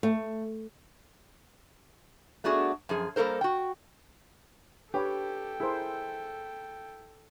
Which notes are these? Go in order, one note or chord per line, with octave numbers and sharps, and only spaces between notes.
A3
A3 B3 D4 F#4 G#4
F#2 F3 G#4
G3 A#3 A4 A#4 C5
F#4 G5
D4 G4 A4 B4 C#5 G5
E4 G#4 A#4 C5